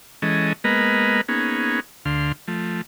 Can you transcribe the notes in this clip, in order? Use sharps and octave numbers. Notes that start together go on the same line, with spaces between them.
E3 G#3 C#4 A4 D#5
G#3 A#3 B3 A#4 B4 D#5
A#3 B3 C#4 D#4 G#4
D2 D3 F5 C6
F3 A3